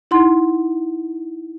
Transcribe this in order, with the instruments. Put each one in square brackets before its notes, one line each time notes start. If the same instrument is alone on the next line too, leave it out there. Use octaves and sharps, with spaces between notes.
[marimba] D#4 E4 F#5 C6